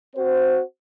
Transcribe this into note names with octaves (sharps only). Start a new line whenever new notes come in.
C4 F#4 C5